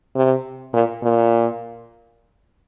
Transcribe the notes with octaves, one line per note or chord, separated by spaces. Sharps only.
C3
A#2
A#2